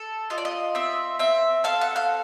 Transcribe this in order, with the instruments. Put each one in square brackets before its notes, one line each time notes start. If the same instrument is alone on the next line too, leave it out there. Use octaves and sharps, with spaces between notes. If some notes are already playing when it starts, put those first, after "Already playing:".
Already playing: [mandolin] A4
F4 D#5
D5
D#5
C4 E5
C4 E5
A4 F5
F#5
F5